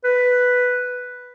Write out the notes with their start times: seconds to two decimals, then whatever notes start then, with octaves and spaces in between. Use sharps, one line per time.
0.04 B4